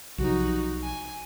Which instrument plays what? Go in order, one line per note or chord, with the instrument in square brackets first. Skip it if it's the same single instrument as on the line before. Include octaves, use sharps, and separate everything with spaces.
[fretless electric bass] B1 C3 F3 [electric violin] D#4 F#4
[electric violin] G#5